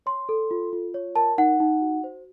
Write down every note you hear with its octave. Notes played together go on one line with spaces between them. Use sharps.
C#5 C6
A4
F4
F4
C#5
A#4 A5
D#4 F#5
D#4
F#4
C5